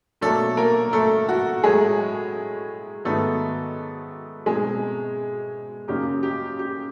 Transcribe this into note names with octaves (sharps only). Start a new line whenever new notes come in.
B2 F#3 A3 A#3 D4 A4
A#3 A#4
A3 A4
F#4
A2 F#3 G#3 A3 G#4
G#2 D#3 F#3 A3 B3 D#4 A4
B2 G#3 C4 D#4 G#4
F#2 C#3 F#3 A#3 D#4 G4
G4
G4